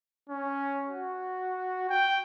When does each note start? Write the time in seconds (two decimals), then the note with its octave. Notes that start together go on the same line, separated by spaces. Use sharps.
0.30 C#4
0.88 F#4
1.90 G5